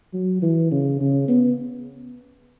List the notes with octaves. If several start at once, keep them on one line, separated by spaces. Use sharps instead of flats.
F#3
E3
C#3
C#3
B3